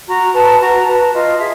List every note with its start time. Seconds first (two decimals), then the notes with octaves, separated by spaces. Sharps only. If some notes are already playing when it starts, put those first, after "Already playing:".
0.08 F#4 A#5
0.34 B4 A5
0.60 F#4 A#5
0.86 B4 A5
1.13 F4 D#5
1.39 G#4 E5